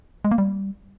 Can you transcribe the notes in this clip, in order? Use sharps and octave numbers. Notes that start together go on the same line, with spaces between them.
G#3
A#3
G3